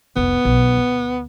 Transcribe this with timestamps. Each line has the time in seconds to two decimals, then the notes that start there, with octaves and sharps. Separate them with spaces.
0.17 F1 C2 B3
0.45 B1
0.77 D2